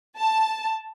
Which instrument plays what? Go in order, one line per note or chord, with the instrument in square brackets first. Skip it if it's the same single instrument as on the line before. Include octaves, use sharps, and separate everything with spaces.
[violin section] A5